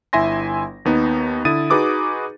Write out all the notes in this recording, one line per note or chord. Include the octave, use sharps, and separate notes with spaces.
G1 E4 E5 G#5 C6 A#6
D#2 B3 D#4
D3 E4 D#6 A6 D#7
D#4 F#4 G#4 B4 D6 D#6